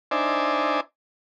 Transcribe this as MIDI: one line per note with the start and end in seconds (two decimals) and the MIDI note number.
0.11 0.80 62
0.11 0.80 63
0.11 0.80 72
0.11 0.80 74
0.11 0.80 76
0.11 0.80 80